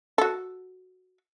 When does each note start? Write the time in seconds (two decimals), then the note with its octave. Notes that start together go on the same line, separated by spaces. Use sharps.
0.18 F#4 A4